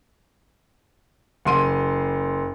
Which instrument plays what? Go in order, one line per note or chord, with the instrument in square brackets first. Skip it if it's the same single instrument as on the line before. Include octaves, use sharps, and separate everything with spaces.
[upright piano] F#1 C6 D#7